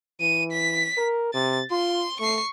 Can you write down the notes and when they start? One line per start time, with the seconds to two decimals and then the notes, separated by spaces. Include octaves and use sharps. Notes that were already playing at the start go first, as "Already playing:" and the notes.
0.20 E3 D#7
0.51 B6
0.97 A#4
1.34 C3 A6
1.71 F4 C6
2.20 A3 C#6 C7